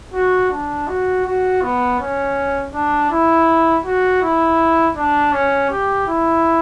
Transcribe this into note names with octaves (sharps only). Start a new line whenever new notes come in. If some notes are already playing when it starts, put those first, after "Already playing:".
F#4
D4
F#4
F#4
B3
C#4
D4
E4
F#4
E4
D4
C#4
G4
E4